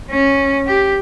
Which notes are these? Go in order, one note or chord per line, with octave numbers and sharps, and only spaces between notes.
C#4
G4